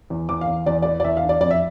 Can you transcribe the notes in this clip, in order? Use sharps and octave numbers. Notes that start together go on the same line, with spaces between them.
E2
E2 D6
F5
E2
E2 D5
E3 D5
D5
E2 E5
F5
D4
D5
F2 D5
E5